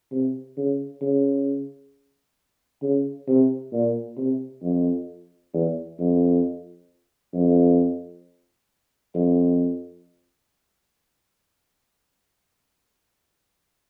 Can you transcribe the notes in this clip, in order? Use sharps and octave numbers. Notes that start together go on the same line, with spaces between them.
C3
C#3
C#3
C#3
C3
A#2
C3
F2
E2
F2
F2
F2